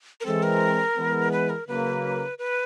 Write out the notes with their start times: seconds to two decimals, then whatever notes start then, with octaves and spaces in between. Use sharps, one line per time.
0.20 A#4
0.26 E3 G#3 C4 A4
0.43 A#4
0.96 E3 G#3 B3
1.32 B4
1.49 A#4
1.67 C#3 F#3 A#3 B4
2.38 B4